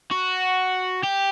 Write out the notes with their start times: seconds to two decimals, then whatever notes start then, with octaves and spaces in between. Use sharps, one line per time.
0.11 F#4
1.04 G4